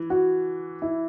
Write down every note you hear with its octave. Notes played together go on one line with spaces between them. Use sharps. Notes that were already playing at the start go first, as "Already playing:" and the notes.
Already playing: E3
F#4
E4